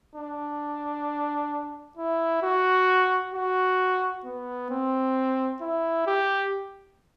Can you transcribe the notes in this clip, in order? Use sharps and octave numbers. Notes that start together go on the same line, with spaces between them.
D4
E4
F#4
F#4
B3
C4
E4
G4